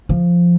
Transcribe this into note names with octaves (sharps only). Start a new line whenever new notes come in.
F3